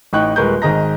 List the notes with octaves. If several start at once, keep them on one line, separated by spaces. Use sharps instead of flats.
A1 D#4 D#5 G5 C#6 F#6
D#1 G#3 A#4 B4 C#6 G6
G#1 D#3 G#4 D#5 A#5 A#6